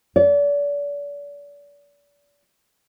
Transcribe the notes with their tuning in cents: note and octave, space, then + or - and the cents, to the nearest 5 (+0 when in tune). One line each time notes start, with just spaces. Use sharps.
D5 -35